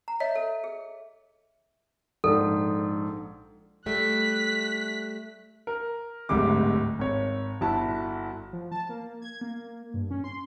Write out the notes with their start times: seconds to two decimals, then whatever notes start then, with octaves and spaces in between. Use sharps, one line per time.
0.08 A#5
0.20 C#5 D#5 E5
0.36 A4
0.64 G#4
2.24 A#1 G#2 A4
3.86 G3 A3 F#6 B6
5.67 A#4
6.29 D1 G#1 D2 G3 G#3 D6
6.99 G#1 C#5
7.61 G1 E4 F#4 A5
8.53 F3
8.72 A5
8.89 A#3
9.22 G#6
9.41 A#3
9.94 G2
10.11 C#4
10.24 C6